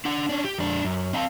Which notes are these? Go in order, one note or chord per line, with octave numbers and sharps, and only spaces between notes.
D4 F#5
C#4 D4
G4
F2 D4
F#2
C4 D#5 F5 G5 A5